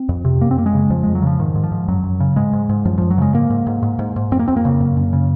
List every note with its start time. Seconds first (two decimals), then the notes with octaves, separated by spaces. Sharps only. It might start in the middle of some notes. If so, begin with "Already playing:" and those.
Already playing: C4
0.09 F2
0.25 C3
0.41 F#2 A#3
0.51 C4
0.57 F#2 A#3
0.66 G#3
0.74 C#3
0.90 F2 F3
1.03 F2 G#3
1.15 F#3
1.22 C#3 F3
1.39 G#2 D#3
1.55 G#2
1.64 F3
1.72 G#2
1.88 F#2 F#3
2.04 F#2
2.20 C#3
2.36 G#2 G#3
2.53 G#2
2.69 G#2
2.85 F#2 F3
2.98 F#2 F3
3.10 F#3
3.18 C#3 G#3
3.34 G#2 A#3
3.50 G#2
3.67 G#2
3.83 G#2
3.99 G#2
4.16 G#2
4.31 F2 C4
4.39 A#3
4.48 F2 C4
4.57 A#3
4.65 C#3
4.80 F#2
4.97 F#2
5.13 C#3